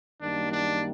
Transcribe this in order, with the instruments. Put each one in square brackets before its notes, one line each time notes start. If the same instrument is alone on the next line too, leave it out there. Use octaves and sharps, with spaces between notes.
[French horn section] F#2 D#3 G3 A#3 [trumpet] D4
[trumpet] D4